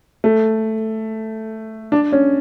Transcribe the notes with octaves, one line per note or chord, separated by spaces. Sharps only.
A3
D4
C#4